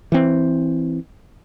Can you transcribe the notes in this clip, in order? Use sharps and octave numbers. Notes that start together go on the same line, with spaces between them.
E3 C4